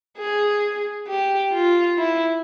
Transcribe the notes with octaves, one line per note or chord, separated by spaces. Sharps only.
G#4
G4
F4
E4